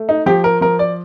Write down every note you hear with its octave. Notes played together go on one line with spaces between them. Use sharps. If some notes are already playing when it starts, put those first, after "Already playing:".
Already playing: A3
D#4
F3 G4
A#4
F3 A#4
D5